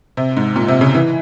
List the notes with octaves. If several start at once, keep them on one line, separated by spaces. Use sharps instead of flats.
C3
G#2
A#2
C3
C#3
E3